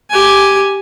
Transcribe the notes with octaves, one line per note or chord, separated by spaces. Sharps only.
G4 G#5